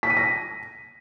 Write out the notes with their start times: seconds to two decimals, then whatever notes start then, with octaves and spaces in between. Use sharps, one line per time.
0.03 B6
0.10 D#7
0.17 A#6